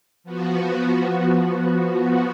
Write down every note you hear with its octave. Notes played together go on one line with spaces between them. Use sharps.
F3 B3 F#4